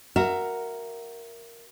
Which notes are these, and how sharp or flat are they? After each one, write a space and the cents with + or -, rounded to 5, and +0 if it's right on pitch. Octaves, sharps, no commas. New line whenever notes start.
F#4 +0 A#4 +0 E5 +20